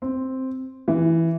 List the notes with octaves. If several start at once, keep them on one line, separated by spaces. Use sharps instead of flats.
C4
E3